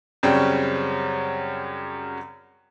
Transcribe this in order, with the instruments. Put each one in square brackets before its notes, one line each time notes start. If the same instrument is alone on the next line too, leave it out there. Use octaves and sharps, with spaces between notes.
[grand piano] F#2 C#3 G3 C4 C#4